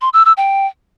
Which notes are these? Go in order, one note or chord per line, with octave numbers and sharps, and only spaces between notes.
C6
E6
E6
G5